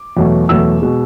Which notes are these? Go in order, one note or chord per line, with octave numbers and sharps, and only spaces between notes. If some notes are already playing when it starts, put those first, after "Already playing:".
Already playing: D6
E2 B2 F#3 A3
E2 B2 F#3 A3 E6
B2 G#3